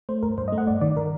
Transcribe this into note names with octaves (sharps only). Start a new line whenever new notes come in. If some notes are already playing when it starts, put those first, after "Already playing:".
A3 C5
G2 A#4
G2 C5
D#5
A3
F#5
G2 D5
D#3 D5
D#3 A#4